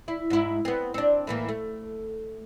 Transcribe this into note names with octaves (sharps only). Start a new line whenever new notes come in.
E4
G#2 E4
B3 C4
C4 D4
A2 E3 A#3
A3